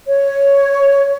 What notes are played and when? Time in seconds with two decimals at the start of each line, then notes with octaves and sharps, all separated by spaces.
0.07 C#5